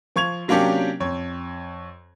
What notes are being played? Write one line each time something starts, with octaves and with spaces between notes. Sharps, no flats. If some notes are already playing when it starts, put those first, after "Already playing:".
F3 C#6 G#6 F7
C3 F#3 A#3 C#4 D4 G4
F2 C#5